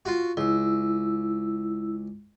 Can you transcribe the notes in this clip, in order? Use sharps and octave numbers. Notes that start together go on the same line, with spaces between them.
F4 F#4
C#2 E4 E6